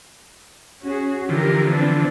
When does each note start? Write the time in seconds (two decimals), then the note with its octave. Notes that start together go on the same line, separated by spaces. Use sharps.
0.82 C#4 F#4 G#4
1.29 D3 E3 F3 G4 A#4
1.66 B3 C4 D4